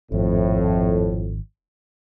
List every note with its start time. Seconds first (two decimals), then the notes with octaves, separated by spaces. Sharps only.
0.12 G#1 F2 A2